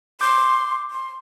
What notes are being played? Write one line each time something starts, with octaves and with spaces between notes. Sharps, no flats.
C6 D6 G6
C6